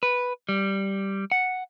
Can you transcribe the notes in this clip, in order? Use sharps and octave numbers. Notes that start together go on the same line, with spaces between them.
B4
G3
F#5